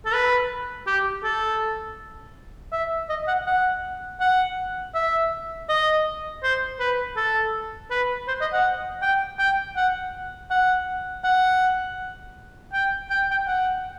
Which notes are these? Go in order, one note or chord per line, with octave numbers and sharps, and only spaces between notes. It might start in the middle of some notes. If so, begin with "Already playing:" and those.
A4
B4
G4
A4
E5
D#5
F#5
F#5
F#5
E5
D#5
C5
B4
A4
B4
C5
D#5
F#5
G5
G5
F#5
F#5
F#5
G5
G5
G5
F#5